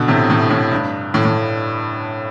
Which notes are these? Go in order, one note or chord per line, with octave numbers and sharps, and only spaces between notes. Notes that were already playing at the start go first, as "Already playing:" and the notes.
Already playing: B2 D3
A2 C3
A2
A2
G2
A2
A2